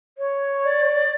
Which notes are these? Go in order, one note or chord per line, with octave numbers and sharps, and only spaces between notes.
C#5
D5